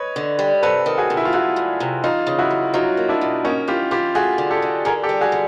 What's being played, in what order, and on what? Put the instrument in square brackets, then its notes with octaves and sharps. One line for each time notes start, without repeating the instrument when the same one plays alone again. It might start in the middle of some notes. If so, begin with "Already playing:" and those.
Already playing: [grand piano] B4 C#5 D#5
[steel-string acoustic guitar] D3
G3
[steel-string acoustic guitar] C3 [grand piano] A4 B4
[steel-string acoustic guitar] D#3
[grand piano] F#4 G#4
[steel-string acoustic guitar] C3
[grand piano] E4
F4
[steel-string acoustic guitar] D2 [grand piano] E4 F#4
[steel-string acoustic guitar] D2
C3
[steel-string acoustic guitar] E3 [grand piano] D#4 F4
[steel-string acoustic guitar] C#3
[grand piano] E4 F#4
[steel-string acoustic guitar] F#2
[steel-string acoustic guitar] F#3 [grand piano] D#4 F4
[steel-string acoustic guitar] A#3
[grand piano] D4 E4
[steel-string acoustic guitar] B2
[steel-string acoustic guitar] A#3 [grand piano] C#4 D#4
[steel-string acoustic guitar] E3 [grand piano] F4 G4
[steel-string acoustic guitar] E3 [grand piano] F4 G4
[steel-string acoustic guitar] A3 [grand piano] F#4 G#4
[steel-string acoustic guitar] D3
[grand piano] G4 A4
[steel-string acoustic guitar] D3
[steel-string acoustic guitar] D3 [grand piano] G#4 A#4
[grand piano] G4 A4
[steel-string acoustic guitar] G3
[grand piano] F#4 G#4
[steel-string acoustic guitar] D3